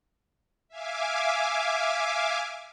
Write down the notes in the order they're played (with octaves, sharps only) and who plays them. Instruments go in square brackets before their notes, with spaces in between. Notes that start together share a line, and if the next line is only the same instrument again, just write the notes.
[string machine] E5 F5 G#5 D6